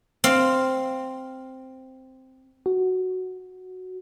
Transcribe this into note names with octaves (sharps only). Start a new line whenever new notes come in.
C4 F5
F#4